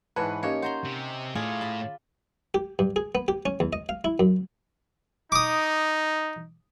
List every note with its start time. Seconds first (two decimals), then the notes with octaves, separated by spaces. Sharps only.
0.16 G#2 E3 B4 C#5 A5 B5 F#6
0.43 A#3 C#4 D#4 G4 C#5 F5
0.62 C5 F#5 A#5 C6
0.84 C3
1.35 A2 F4 G#4 D5
1.61 A5 B5
2.54 G4
2.79 G2
2.96 G#4
3.15 B3
3.28 G4
3.46 C#4
3.60 E2
3.73 D#5
3.89 F5
4.04 E4
4.20 F#2
5.32 D#4 D6 D#6